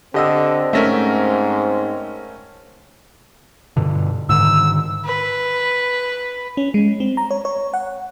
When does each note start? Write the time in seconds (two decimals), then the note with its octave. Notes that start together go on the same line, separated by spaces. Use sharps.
0.14 D3 C4 G4 D#5 E6
0.73 G#2 A3 C#4 A#4 E5 A#6 B6
3.77 G2 B2 D3
4.29 G#2 D3 D#3 E6
5.05 B4
6.57 C#4
6.74 G#3
7.00 C4
7.17 A#5
7.31 C#5
7.45 C#5
7.74 F#5